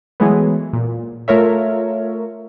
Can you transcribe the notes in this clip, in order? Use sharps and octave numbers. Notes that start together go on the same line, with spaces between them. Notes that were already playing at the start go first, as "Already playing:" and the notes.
E3 F#3 G#3 A3 B3
A#2
A3 F4 A#4 C#5 E5